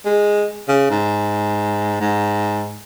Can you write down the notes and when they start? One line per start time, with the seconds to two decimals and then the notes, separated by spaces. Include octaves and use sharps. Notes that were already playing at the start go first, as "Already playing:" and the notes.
0.06 G#3
0.68 C#3
0.90 G#2
2.01 G#2